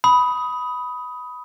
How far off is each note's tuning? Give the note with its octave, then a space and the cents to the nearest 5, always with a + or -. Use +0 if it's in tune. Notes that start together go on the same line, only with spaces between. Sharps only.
B5 +0 D#6 +15